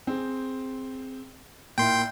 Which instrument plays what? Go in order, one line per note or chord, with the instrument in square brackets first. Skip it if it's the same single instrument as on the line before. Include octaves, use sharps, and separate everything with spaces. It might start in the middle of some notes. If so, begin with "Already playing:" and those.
[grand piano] C4 G#4
[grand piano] A#2 A#3 E4 [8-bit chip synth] G5 C6